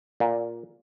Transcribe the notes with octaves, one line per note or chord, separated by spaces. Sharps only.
A#2